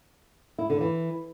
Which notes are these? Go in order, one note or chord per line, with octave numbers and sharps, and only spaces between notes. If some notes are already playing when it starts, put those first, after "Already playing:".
E4
D3
E3